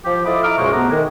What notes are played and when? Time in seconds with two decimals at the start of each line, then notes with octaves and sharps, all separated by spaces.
0.05 F3 G4
0.26 E4 F4 A4 D#5 B5 D6
0.44 E5 A#5 D6 F6
0.58 C#2 F#2 B2 G#3 C5 C#6
0.73 C2 A3 B3 F#5 A#5 D6
0.91 D#3 G#3